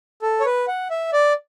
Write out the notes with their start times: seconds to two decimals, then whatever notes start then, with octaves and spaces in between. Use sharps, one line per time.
0.22 A4
0.40 C#5
0.45 B4
0.68 F#5
0.90 E5
1.13 D5